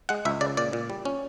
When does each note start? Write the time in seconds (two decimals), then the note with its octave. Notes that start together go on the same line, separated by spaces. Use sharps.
0.09 G#3 F#5
0.25 C#2 E5
0.41 C#3 D5
0.57 A#2 D5
0.73 A#2
0.90 G3
1.05 C#4